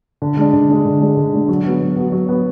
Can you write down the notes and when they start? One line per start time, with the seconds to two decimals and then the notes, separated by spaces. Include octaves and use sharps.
0.22 D3
0.37 G#3 D4
0.53 D3
0.69 G#3 D4
0.85 D3
1.01 G#3 D4
1.17 D3
1.34 G#3 D4
1.48 F#3
1.65 B3 F#4
1.81 F#3
1.96 B3 F#4
2.12 F#3
2.29 B3 F#4